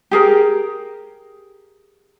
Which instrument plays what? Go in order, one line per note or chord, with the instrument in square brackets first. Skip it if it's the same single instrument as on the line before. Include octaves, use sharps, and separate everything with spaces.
[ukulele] G4 G#4 A#4